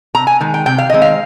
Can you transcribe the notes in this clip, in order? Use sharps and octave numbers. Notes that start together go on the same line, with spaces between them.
C3 A#5
G#5
D#3 G#3
G5
C3 G5
F5
D#3 G#3 C4 D#5
F5